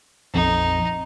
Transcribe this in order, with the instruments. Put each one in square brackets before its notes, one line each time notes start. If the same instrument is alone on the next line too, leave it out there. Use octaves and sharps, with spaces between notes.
[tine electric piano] A#1 F2 [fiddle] D#4